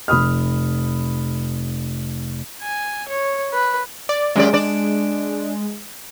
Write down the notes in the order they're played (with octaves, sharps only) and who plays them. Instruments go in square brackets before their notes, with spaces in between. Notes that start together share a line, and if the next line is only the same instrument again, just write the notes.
[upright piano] F1 B5 D#6 F6
[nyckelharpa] G#5
C#5
B4
[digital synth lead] D5
[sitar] F#2 G4 D5 [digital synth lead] G#3
[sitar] D4 D5